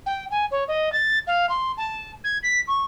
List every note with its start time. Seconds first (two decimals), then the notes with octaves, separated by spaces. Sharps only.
0.06 G5
0.31 G#5
0.51 C#5
0.68 D#5
0.92 A6
1.27 F5
1.49 C6
1.77 A5
2.24 G#6
2.43 B6
2.67 C#6